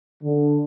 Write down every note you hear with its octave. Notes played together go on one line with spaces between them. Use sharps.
D3